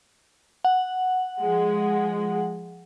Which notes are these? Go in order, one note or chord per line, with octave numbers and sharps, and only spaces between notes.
F#5
F3 G#3